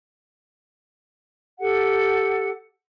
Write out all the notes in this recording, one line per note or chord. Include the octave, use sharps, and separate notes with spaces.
G4 A4 F#5